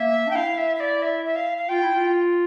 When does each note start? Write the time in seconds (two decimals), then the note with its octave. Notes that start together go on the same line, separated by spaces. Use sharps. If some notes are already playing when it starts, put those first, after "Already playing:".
Already playing: A#3 E5
0.27 D4
0.30 G5
0.35 E4 F5
0.57 E5
0.75 E5
0.80 D5
1.02 E5
1.25 E5
1.36 F5
1.57 F5
1.68 F4 G5
1.82 E4
1.95 F4